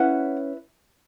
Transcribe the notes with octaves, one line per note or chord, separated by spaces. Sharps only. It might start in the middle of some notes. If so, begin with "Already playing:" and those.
Already playing: C#4 E4 B4 F#5